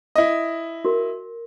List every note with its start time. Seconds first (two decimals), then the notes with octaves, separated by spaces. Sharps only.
0.16 E4 D#5
0.85 F#4 A#4